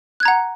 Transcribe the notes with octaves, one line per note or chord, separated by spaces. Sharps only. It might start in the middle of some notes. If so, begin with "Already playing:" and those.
F#5 A#5 F#6 G#6